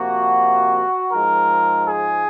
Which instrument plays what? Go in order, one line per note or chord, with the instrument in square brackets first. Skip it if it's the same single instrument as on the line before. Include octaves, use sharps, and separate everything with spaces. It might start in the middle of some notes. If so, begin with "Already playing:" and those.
Already playing: [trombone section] C3 F3 A#3 F#4
G#2 F3 G#3 A#4
G#4